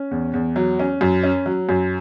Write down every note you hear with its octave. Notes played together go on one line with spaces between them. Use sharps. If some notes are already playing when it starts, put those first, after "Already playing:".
Already playing: C#4
E2
E2
F#3
C#4
F#2
C#4
F#3
F#2